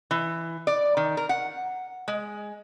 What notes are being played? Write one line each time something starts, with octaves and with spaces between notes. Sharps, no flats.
E3
D5
D#3
A#4
F#5
G#3